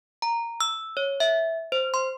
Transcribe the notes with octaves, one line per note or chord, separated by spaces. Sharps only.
A#5
E6
C#5
E5
C5
C6